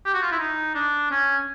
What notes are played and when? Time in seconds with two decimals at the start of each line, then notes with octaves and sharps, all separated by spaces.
0.06 G4
0.14 F#4
0.22 F4
0.31 E4
0.39 D#4
0.75 D4
1.11 C#4